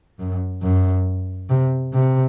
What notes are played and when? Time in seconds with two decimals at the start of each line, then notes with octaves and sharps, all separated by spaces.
0.19 F#2
0.62 F#2
1.50 C3
1.94 C3